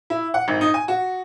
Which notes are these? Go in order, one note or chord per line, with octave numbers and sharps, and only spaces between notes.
E4
F#5
G#1
D#4
G#5
F#4